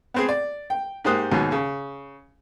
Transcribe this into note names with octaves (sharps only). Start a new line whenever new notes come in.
B3 C4 G#4
D5
G5
G#2 A#3 G4 C5 D#6 F#6
D#2 G#2 B2 F#3
C#3